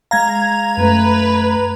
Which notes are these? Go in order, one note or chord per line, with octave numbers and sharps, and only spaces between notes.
G#3 F5 A#5 G#6
F#2 A3 B4